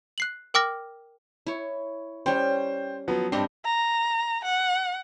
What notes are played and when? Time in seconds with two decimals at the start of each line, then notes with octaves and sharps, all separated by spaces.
0.18 F#6 C7 F#7
0.54 A#4 G5 D6 F6 A#6
1.47 E4 C#5
2.26 G3 C#4 C5 G5
3.08 F3 F#3 B3
3.32 G2 C4 D4 G4 D#5
3.65 A#5
4.45 F#5